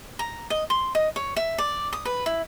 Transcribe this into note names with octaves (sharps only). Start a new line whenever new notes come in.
A#5
D#5
C6
D#5
C#5
E5
D5
D#6
B4
E4